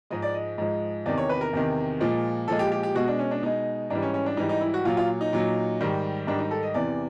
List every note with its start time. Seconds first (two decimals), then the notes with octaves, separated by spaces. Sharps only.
0.10 G#2 F3 G#3 D#5
0.22 D5
0.34 D#5
0.58 G#2 F3 G#3
1.06 E2 C3 D#3 D5
1.18 C#5
1.29 B4
1.41 A#4
1.53 E2 C3 D#3
2.00 A#2 F3 G#3
2.48 A#2 F3 G#3 A4
2.59 G4
2.72 G4
2.83 G4
2.95 B2 G#3 F#4
3.08 D4
3.19 C#4
3.31 D4
3.42 B2 G#3 D#4
3.90 G#2 E3 G3 D4
4.02 C#4
4.14 C#4
4.26 D4
4.37 G#2 E3 G3 D#4
4.49 D#4
4.61 E4
4.74 F#4
4.85 A#2 F#3 F4
4.97 F4
5.21 D#4
5.33 A#2 F#3
5.81 G#2 D#3 G3
6.27 G#2 D#3 G3 D4
6.39 D#4
6.51 A4
6.63 D#5
6.74 E2 C3 E3 D5